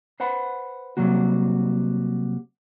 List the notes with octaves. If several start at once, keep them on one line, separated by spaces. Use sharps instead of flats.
B4 C5 F#5 B5
C3 D#3 F#3 G3 A#3 F#4